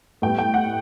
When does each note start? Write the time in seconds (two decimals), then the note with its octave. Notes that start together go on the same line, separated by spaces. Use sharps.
0.22 A2 G3 B3 G5
0.39 G5
0.54 F#5